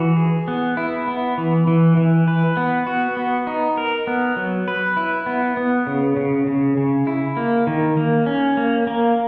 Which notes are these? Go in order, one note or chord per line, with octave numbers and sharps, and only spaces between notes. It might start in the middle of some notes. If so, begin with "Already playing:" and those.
Already playing: E3 F#4
G#4
B3
E4
B3
E3
E3
E3
B4
B3
F#4
B3
D#4
A#4
B3
F#3
B4
E4
B3
B3
C#3
C#3
C#3
C#3
E4
A#3
D#3
A#3
C#4
A#3
A#3